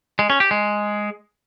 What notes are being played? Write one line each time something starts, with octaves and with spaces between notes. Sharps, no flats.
G#3
C#4
G4
G#3